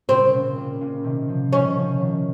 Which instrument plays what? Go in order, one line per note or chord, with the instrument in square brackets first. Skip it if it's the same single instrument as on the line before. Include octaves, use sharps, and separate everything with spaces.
[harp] A#2 C#3 [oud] C4
[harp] A#2 C#3
A#2 C#3
A#2 C#3
C3 D#3
C#3 F3
[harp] C3 D#3 [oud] C#4
[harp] C#3 F3
C3 D#3